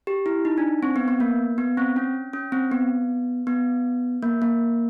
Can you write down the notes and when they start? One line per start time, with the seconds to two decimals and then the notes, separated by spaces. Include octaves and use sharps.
0.07 G4
0.26 E4
0.45 D#4
0.58 D4
0.83 C4
0.96 B3
1.08 B3
1.20 A#3
1.58 B3
1.77 C4
1.96 C#4
2.33 C#4
2.52 C4
2.72 B3
3.47 B3
4.23 A#3
4.42 A#3